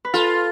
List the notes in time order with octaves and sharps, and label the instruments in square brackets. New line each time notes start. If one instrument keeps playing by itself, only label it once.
[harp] B4
[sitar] F4 [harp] A4